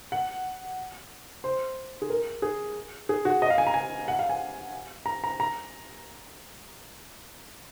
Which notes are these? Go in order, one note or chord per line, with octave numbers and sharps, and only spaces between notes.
F#5
C5
G#4
A#4
G#4
G#4
F#4
D#5
F5
G#5
A#5
G#5
F#5
F5
G#5
A#5
A#5
A#5